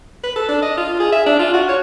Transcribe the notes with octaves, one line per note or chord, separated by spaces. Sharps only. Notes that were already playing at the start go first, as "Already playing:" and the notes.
B4
A4
D4
D#5
F4
G#4
E5
D4
F4
F#4
C#5